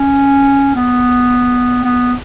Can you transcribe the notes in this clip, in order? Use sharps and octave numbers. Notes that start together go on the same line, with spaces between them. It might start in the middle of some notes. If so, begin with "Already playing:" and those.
Already playing: C#4
B3
B3